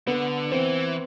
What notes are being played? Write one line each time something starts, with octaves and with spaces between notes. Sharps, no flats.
D3 B3
E3 C4